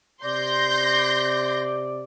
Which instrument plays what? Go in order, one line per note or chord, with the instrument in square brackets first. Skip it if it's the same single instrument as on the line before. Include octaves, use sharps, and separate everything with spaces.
[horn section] C3 D5 [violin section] C6 G6 A#6